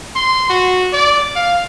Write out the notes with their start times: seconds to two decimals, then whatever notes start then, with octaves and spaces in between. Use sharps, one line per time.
0.16 C6
0.50 F#4
0.93 D5
1.36 F5